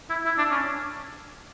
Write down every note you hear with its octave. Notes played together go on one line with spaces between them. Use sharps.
E4
E4
D4
C#4